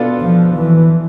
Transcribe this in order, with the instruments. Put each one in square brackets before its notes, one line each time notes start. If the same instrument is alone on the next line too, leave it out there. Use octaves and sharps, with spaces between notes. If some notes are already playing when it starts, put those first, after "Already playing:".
Already playing: [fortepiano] B2 B3 D4 F4 A4
[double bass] F3
E3